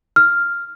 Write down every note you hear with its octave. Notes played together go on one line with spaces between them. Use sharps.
F6